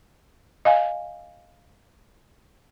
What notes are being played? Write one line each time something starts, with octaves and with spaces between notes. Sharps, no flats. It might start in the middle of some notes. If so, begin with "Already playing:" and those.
D#5 F5 G#5